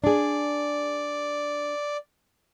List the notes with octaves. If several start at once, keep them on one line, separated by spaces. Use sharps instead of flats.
D4 G#4 D5